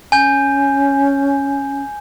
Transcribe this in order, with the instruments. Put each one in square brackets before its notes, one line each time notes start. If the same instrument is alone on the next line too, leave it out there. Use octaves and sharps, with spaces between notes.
[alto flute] C#4 [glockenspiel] G#5 G6